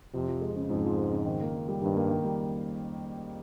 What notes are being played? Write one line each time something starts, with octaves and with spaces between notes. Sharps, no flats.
F2 C3
F3
G#3
C#3
F2 G#2
F3
G#3
C#3
D#3
A#3
D#3
G3
G2 D#3
A#3
D#3
G3